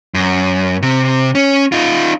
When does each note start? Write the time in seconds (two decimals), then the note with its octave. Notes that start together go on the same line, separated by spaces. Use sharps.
0.14 F#2
0.82 C3
1.35 C#4
1.72 D#4 F4